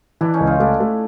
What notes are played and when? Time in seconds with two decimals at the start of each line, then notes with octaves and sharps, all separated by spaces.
0.21 E3 D4 E4
0.34 C#4 D#4
0.40 C#2
0.47 D#4 F4
0.60 A3 D4 E4
0.80 A3